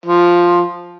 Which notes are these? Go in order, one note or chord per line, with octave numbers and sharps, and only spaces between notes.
F3